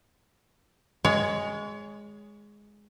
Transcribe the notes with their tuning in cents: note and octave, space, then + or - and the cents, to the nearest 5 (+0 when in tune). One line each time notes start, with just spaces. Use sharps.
G#3 +0 C#5 +30